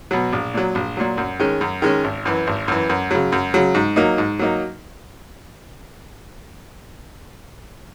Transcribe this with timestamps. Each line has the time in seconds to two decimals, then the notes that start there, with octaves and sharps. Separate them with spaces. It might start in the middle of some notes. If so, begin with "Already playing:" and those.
0.11 B2 F#3
0.33 A#1
0.54 A#2 F#3
0.75 A#1
0.97 A#2 F#3
1.18 F#2
1.39 D#3 G#3 C#4
1.61 F#2
1.82 D#3 G#3 C#4
2.04 G#1
2.25 F#2 E3
2.47 G#1
2.68 F#2 E3
2.89 F#2
3.11 C#3 F#3
3.32 F#2
3.54 C#3 F#3
3.74 G#2
3.96 F#3 A#3 D#4
4.18 G#2
4.39 F#3 A#3 D#4